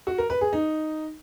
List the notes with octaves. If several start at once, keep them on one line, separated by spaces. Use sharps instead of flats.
F#4
A#4
B4
G#4
D#4